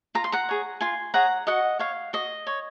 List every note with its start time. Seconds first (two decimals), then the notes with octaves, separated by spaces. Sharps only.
0.15 F4 A#5
0.24 C6
0.32 F#5 A#5
0.49 G#4 C#5
0.81 F4 G#5 C6
1.14 G#4 C#5 F#5 A#5
1.47 F#4 D#5 F#5
1.79 C#5 F5
2.13 F#4 D#5
2.47 C#5